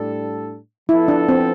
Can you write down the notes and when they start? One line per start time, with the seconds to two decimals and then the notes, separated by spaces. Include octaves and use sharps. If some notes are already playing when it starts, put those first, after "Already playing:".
Already playing: A2 G3 D4 A4
0.89 F3 B3 E4 F4 A4
1.08 D4
1.29 C4